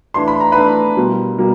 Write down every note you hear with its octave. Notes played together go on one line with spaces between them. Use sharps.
E3 A3 D4 C6
B5
A#5
E3 A3 D4 B4 B5
B2 G3 A#3
B2 G3 A#3